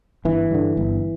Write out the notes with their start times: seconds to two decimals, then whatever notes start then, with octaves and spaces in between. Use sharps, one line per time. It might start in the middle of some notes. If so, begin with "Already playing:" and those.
0.25 G1 E3
0.51 G2 D3
0.77 G1